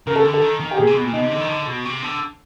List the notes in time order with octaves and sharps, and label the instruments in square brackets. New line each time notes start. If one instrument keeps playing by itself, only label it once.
[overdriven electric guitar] C#3 [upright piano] A#4
[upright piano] A4
[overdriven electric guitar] D3
[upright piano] A4
[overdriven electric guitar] D#3
D#3
[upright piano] G4
[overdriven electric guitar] A#2 [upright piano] G#4
[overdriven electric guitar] C3
B2
A#2
[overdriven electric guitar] B2 [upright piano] D#4
[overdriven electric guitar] C3
D3
D#3
D3
B2
C3
D3